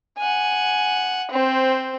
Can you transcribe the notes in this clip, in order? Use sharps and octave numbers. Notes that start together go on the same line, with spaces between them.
F#5 G#5
C4 C5